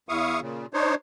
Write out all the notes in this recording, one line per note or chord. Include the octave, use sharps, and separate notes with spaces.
E2 E4 F5 C#6 D#6
A#2 C#3
D4 D#4 C5 C#5